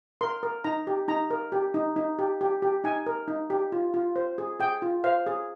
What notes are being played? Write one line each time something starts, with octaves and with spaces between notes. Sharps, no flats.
A#4 C6
A#4
D#4 A#5
G4
D#4 A#5
A#4
G4
D#4
D#4
G4
G4
G4
D#4 G#5
A#4
D#4
G4
F4
F4
C5
G#4
G#4 G5
F4
C5 F5
G#4